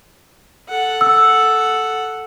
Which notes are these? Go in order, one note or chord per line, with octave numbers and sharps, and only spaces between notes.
A4 F#5
E6